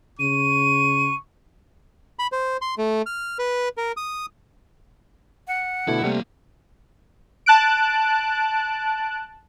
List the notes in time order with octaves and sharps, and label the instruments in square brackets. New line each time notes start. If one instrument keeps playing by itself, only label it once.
[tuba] C#3 [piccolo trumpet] C#6 [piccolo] D#7
[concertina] B5
C5
C6
A3
F6
B4
A#4
D#6
[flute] F#5
[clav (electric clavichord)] B2 D3 A3 [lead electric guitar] E4
[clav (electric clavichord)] C3 G3 A3 [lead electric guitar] A#3 E5
[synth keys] A5 F#6 D7